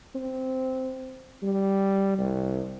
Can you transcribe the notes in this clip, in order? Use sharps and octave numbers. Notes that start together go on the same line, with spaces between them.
C4
G3
C2